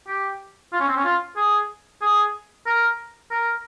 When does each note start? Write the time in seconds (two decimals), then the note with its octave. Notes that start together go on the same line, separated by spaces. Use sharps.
0.07 G4
0.72 F4
0.80 C#4
0.88 C4
0.97 C#4
1.04 F4
1.37 G#4
2.02 G#4
2.66 A#4
3.31 A#4